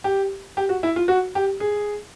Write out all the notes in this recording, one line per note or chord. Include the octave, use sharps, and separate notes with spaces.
G4
G4
F#4
E4
F4
F#4
G4
G#4